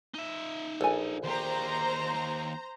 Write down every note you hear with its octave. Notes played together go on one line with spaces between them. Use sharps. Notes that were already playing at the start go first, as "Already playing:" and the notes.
D#4 E5
A#1 A4 G#5
D#2 G4 C5 A#5